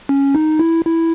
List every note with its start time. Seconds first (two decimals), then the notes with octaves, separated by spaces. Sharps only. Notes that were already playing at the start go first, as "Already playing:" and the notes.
0.09 C#4
0.35 D#4
0.59 E4
0.85 E4